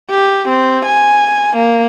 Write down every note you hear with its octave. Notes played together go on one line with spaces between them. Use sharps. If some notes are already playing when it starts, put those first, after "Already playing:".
G4
C4
G#5
A#3